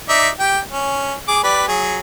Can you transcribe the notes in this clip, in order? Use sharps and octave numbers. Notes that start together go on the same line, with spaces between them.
D#4 D5 E5
G4 G5
C#4
G#4 D6
G4 B4 D5
F#3 G#4